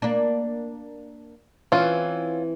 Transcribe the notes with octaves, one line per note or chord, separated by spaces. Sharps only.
A#3 D4
E3 C4 C#4 F4